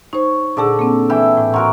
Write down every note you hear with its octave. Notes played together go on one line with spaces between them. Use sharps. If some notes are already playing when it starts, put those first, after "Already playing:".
D#4 C5 C#5
A#2 D3 G#4 A4 D5
A#3 C4
E3 E4 G5
A2
F#4 A#4 C#5 F#5 A#5 C6